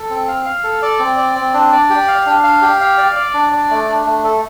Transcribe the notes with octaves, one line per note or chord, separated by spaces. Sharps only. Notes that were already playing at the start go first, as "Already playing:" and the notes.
Already playing: A4
C4
F5
F5
A4
D5
C4
D5
C4
D4
D5
G4
F5
D4
F5
G4
F5
D5
D5
D4
D5
A3
D4
A3
A4